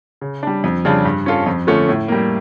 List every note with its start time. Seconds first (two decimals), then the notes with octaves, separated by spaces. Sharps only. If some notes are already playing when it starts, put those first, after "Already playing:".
0.21 C#3
0.43 G3 D4
0.64 F2
0.85 C#3 G3 D4 F4
1.05 G2
1.26 F3 C#4 F4 A4
1.46 F2
1.67 D3 F3 A3 C#4
1.89 A2
2.08 G3 A#3